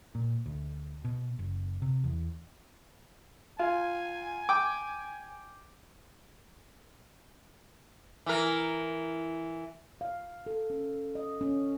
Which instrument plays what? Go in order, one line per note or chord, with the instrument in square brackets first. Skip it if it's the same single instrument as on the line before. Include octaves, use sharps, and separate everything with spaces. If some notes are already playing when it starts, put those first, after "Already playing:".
[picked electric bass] A#2
D2
B2
F#1
C3
E2
[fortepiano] F4 [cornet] G#5
[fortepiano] G5 D6
[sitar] E3 A#4
[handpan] F5
A4
C#4
D#5
C#4